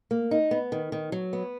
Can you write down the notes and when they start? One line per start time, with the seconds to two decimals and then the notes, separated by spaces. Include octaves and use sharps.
0.11 A#3
0.31 D#4
0.51 B3
0.72 D#3
0.92 D#3
1.12 F#3
1.33 B3